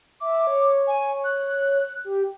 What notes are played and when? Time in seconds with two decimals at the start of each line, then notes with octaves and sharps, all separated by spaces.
0.21 E5 D6
0.47 C#5
0.87 G#5
1.24 F#6
2.05 G4